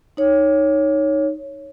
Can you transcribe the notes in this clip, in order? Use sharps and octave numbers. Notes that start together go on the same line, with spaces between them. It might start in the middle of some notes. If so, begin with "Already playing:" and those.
D#4 C#5